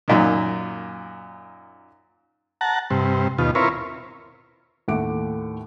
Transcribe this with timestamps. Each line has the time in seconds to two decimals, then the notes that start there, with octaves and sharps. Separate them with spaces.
0.08 F#2 A#2 D#3
2.61 F#5 A5 A#5
2.90 G2 C3
3.38 D#2 B2 F4
3.55 C4 E4 F4 A#4 B4 C#5
4.88 D#2 A2 A3 F#5 D6 D7